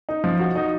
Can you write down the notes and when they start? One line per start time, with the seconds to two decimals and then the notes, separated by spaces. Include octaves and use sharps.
0.09 D#4
0.24 F3
0.39 F#4
0.56 D#4